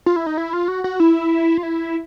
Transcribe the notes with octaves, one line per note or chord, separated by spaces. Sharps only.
F4
E4
D#4
E4
F4
F#4
F#4
E4
F4
E4